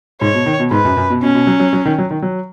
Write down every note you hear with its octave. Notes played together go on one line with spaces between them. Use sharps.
G#2 C#5
B2
D#3
B2
G#2 B4
F#2
F#2
B2
B2 C#4
B2
F#3
F#3
F#3
D#3
F#3
D#3
F#3